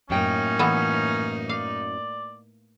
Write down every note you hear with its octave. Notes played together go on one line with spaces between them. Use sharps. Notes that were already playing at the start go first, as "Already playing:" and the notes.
F#2 A2 A#3 C#4 D#4 G5
E3 B3
D5 F5